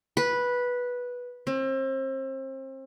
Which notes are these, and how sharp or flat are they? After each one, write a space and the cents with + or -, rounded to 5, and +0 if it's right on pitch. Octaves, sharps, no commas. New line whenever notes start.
B4 -10
C4 +35